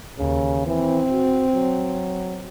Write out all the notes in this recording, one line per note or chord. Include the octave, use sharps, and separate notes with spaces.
D#2 C#3
E3 C4
F#4
F#3